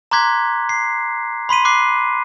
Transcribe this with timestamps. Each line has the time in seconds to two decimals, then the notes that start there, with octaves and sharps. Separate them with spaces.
0.11 A#5 C6 D6 F#6 G#6 B6
0.69 C7
1.49 B5 C6 B6 D#7
1.65 D6 F#6 C7